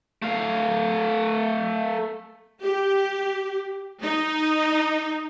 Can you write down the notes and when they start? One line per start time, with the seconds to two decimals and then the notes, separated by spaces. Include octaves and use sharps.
0.22 A3 F5
2.62 G4
4.02 D#4